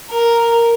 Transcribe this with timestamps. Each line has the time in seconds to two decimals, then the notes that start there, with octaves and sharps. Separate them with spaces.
0.10 A#4